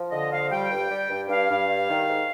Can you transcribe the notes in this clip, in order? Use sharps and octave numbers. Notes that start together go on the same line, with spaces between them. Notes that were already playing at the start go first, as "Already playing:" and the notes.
Already playing: F3
D3 D#5
F3 F5
G3 G5
G2
G3
G2
G2 F5
G2
G3
D#3
G#2